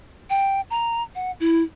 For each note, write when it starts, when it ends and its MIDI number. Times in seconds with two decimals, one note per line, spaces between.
0.30 0.61 79
0.70 1.03 82
1.15 1.31 78
1.40 1.62 64